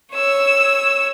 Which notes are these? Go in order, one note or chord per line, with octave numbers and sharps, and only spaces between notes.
C#5 E6